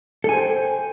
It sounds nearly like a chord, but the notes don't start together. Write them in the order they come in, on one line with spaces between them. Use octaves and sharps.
A4 G#5 C5 G5